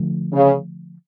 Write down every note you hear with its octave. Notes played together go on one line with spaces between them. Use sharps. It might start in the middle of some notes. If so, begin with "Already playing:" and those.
Already playing: D3 F3 A3
C#3